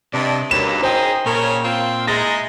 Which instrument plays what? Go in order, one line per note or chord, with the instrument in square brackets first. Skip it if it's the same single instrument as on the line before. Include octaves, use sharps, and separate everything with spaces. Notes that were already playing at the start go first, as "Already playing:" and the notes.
[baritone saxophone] G2 [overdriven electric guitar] C3 [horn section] D4 D5 D#5
[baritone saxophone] D#2 [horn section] C#3 F#3 A#3 [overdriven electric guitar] D4 B4 [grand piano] E7
[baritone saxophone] D#4 [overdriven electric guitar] G#4 [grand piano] C5 G5
[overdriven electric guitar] A#2 [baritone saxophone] C#3 [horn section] C#4 A#4 C#5
[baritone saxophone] C4 [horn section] F4
[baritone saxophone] G#3 [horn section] D#4 E4 G#4 [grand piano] A6 A#6